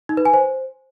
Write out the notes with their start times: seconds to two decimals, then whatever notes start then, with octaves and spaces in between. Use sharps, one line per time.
0.09 D#4
0.17 B4
0.25 G#5
0.34 C5